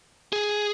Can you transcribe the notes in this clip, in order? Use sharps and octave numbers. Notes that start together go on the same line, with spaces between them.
G#4